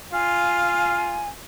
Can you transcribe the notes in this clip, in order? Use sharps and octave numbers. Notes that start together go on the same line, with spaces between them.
F4 F5 G#5